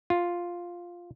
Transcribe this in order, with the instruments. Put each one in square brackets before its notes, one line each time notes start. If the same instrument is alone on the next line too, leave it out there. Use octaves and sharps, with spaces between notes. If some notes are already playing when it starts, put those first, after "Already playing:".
[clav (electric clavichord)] F4